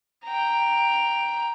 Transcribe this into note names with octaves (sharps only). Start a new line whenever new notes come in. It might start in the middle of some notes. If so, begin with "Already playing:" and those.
G5 A#5